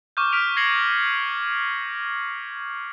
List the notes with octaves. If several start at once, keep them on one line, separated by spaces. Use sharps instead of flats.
C#6 D6 F6 G6
F6 B6 D7 F7
G#6 A#6 C7 C#7 F#7